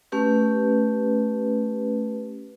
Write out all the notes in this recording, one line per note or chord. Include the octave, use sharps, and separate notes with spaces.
A3 C#4 G4 B4